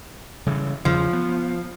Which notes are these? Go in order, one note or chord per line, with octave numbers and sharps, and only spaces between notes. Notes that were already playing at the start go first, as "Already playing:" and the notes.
C#3 E3 G3
E2 C#3 F3
B3